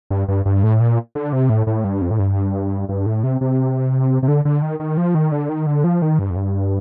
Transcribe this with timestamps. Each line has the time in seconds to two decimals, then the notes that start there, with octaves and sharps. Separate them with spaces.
0.10 G2
0.28 G2
0.45 G2
0.63 A2
0.80 A#2
1.15 D3
1.33 C3
1.49 A2
1.67 A2
1.84 G2
2.02 F2
2.11 A2
2.19 G2
2.89 G2
3.06 A2
3.24 C3
3.41 C3
4.23 C3
4.28 D3
4.45 D3
4.62 D#3
4.80 D#3
4.97 F3
5.15 D#3
5.32 D3
5.49 D#3
5.67 D3
5.84 F3
6.02 D#3
6.19 G2
6.30 F2
6.36 G2